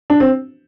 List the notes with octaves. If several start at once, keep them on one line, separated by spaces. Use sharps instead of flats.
D4
C4